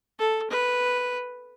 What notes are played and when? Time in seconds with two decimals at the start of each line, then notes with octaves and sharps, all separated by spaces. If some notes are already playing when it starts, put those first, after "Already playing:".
0.19 A4
0.50 B4